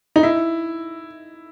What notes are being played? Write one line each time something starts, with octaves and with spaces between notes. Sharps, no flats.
D#4
E4